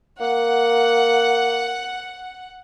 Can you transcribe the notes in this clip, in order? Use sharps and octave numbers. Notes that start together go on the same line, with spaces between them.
A#3 F#5